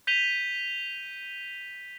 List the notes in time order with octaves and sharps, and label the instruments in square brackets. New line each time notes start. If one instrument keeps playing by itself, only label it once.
[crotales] G6 B6 D#7 F7 G7